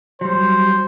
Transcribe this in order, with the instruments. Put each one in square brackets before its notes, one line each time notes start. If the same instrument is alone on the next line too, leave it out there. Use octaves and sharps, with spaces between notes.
[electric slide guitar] F#3 G3 [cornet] C5